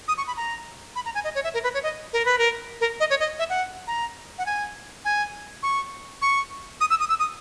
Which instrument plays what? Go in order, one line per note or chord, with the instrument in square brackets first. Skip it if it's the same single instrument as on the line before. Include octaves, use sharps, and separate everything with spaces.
[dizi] D#6
C#6
B5
A#5
B5
A#5
G#5
D#5
C#5
E5
A#4
B4
C#5
D#5
A#4
B4
A#4
A#4
D#5
C#5
D#5
E5
F#5
A#5
F#5
G#5
G#5
C#6
C#6
D#6
E6
D#6
E6
D#6